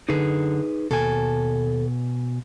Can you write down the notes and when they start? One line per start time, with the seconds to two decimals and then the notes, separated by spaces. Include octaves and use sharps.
0.09 F#2 D3 D#4 G#4 B4
0.91 D#2 B2 A4 G#5